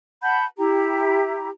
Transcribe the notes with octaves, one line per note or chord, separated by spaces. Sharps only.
F#5 A5 B5 G6
E4 G4 A#5